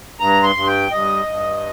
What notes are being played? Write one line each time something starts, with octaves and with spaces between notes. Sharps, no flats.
G2 A#5
C6
G2
G5
G2 D#5
G2